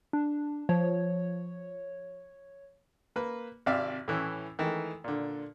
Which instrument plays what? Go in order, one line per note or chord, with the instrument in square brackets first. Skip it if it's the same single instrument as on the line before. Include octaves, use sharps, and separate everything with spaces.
[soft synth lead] D4
[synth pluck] F3 [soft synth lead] C#5
[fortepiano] A#3 B4
G#1 C3 D5 E5 F5
A2 E3 C#4
D#3 E3 G#3 A3
A#2 D3